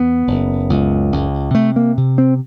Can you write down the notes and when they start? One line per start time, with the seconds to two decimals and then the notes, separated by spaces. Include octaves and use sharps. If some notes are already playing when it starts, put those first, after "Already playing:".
Already playing: E2 B3
0.27 F#1
0.70 C#2
1.12 C#2
1.54 C3 A3
1.76 A#3
1.97 C3
2.18 C4